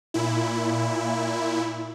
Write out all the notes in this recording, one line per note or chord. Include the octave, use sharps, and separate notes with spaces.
A#2 E4